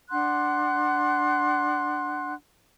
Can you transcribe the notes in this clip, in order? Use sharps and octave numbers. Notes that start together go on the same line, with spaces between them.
D4 F#5 C6 F#6